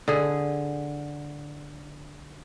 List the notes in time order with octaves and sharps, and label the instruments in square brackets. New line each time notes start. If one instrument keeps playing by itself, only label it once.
[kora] D3 G#4